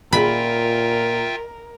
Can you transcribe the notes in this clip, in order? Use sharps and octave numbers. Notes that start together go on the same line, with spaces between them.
A#2 F4 A#4 E5 G5 B5